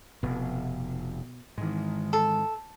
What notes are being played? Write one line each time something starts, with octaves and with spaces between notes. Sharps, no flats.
F1 B2
G#2 D#3 E3 G#3
A4